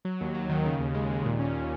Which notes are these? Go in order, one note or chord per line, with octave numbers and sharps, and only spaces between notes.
F#3
D#2
F#3
D#3
C#3
D#2
G#3
D#2
A#2
C#4
A#2